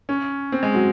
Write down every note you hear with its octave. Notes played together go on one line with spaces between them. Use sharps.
C#4
C4
G#3
F#3